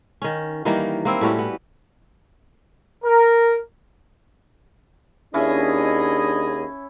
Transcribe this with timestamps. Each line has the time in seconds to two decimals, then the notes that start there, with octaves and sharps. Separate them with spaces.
0.22 D#3 C#4
0.65 D#3 E3 G3 A#3
1.05 A#3 C4 E4
1.21 A2 G3 C#4 F#4
1.39 B3
3.05 A#4
5.34 D#2 C#4 D4 E4 G#4 D#5